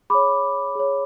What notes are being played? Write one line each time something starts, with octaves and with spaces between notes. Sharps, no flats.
G#4 C#5 B5 D6
G#4 C#5